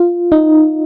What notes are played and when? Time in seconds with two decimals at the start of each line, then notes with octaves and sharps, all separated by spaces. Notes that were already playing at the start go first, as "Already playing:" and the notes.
Already playing: F4
0.32 D#4